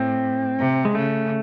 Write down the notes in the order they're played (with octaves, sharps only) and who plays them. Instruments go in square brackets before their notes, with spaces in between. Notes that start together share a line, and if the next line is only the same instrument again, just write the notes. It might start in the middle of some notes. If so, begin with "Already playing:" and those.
Already playing: [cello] A2 [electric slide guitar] C4
[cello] C3
[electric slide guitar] G#3
[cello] C#3 [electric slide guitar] A3